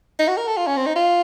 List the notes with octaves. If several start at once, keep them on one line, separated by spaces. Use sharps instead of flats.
D#4
F#4
A#4
A4
F4
C#4
C4
D#4
F4